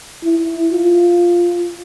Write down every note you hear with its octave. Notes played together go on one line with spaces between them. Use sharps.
E4
F4